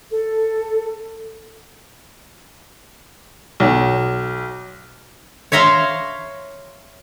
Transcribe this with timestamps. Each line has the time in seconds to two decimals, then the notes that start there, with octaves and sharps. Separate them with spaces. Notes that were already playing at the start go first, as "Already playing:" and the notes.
0.11 A4
3.60 B1
5.52 C#5 E5 F5 A#5 C6